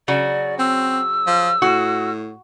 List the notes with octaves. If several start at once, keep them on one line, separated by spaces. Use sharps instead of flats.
C#3 F#3 F#4 D5
C4 E6
F3
A2 F#4